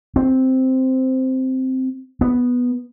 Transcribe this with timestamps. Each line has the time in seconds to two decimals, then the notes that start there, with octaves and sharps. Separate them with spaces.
0.16 C4
2.21 B3